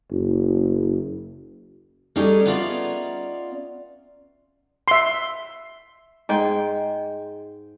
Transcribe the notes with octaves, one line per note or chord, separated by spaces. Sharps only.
F#1
G3 C#4 D#4 G#4 A4 D5
B3 C#4 D#4 F4 D5 E5
E5 C6
G#2 G#3 G5